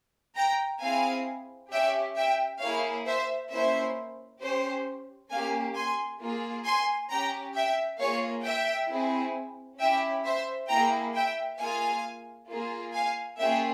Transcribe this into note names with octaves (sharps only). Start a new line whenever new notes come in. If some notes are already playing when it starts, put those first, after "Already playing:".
G5 A#5
C4 E4 G#4 F5 G#5
C#4 G4 E5 G5
E5 G5
A#3 E4 G#4 C#5 F5
C5 E5
A#3 C#4 E4 C5 E5
C#4 G4 C5
A#3 C#4 G4 F5 G#5
G#5 C6
A#3 F4 G#4
G#5 C6
C#4 G4 G5 A#5
E5 G5
A#3 F4 G#4 C#5 F5
E5 G5
C4 E4 G#4
C#4 E4 G4 E5 G5
C5 E5
A#3 E4 G#4 G5 A#5
E5 G5
A#3 F4 G#4 F5 G#5
A#3 F4 G#4
F5 G#5
A#3 C#4 F4 G#4 E5 G5